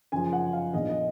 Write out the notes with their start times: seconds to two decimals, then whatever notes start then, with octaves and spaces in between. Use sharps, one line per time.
0.12 F#2 C#3 F3 G#5
0.33 F#5
0.53 F5
0.73 A#1 A#2 F3 B3 D#4 D#5
0.89 D#5